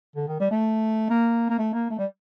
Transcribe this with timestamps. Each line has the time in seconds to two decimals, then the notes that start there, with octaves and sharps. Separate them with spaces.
0.16 D3
0.28 D#3
0.40 G3
0.51 A3
1.10 A#3
1.49 A#3
1.58 A3
1.73 A#3
1.90 A3
1.99 G3